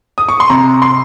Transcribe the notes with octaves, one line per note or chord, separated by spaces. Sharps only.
D#6
C#6
C6
C3 A#5
C6